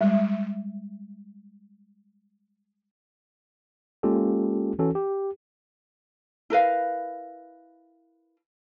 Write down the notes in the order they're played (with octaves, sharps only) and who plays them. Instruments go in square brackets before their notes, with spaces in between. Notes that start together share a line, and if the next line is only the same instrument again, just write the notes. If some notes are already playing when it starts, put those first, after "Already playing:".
[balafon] G3 G#3
[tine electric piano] G#3 A#3 C#4 F4 G4 A4
E3 C#4 F#4 A4
G4
[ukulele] E4 A#4 B4 F5